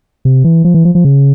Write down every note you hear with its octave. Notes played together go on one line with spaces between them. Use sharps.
C3
E3
F3
E3
F3
F3
C#3